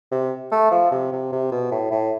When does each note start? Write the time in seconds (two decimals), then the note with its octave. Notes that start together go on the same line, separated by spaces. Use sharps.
0.12 C3
0.51 A3
0.71 F3
0.91 C3
1.12 C3
1.32 C3
1.51 B2
1.71 A2
1.91 A2